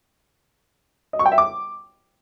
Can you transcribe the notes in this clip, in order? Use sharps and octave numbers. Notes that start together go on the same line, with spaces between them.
D#5
C#6
G5
E5
D6